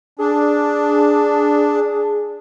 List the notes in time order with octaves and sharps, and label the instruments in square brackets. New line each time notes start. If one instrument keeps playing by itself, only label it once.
[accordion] D4 [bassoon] G#4